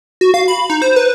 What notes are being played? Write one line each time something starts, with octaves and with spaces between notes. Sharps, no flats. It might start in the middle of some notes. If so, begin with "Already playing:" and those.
F#4
F5
B5
D#4
C5
B4